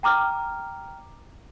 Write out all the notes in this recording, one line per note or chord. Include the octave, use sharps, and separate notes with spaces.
G5 A#5 D6 F6